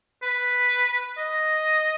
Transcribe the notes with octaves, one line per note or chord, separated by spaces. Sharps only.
B4
D#5